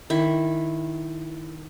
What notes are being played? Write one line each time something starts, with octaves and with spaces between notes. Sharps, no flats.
D#3 E4